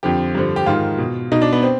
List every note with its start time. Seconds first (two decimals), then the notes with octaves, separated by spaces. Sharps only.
0.03 F2 D3 F3 G4
0.35 G2 D3 F3
0.56 G4
0.66 G#2 D#3 F4
0.98 B2
1.32 B2 D#4
1.42 D4
1.52 B3
1.62 C4